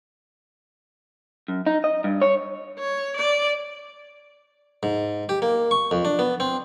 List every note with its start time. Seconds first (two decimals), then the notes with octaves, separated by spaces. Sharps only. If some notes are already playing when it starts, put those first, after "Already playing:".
1.48 F#2
1.67 D#4
1.84 D#5
2.04 G2
2.22 C#5
2.79 C#5
3.16 D5
4.83 G#2
5.29 G4
5.42 A#3
5.71 C#6
5.91 F2
6.05 D4
6.19 B3
6.40 C4